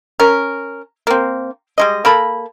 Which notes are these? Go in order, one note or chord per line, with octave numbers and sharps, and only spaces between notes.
C#4 A#4
A#3 C4
G3 G#3 D#5
A#3 A4 B5